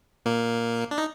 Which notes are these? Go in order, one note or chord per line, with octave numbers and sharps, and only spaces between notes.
A#2 A#3
D4
D#4